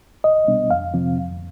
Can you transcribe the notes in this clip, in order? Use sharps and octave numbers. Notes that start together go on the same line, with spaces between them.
C2 D#5
B2 G3 B3 D4
F2 F5
C3 F3 C4
F2